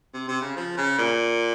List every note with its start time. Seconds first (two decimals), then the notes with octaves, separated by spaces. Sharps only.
0.14 C3
0.28 C3
0.42 C#3
0.56 F3
0.77 C#3
0.98 A#2